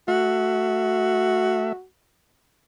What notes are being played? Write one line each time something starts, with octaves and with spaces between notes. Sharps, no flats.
A3 F#4 E5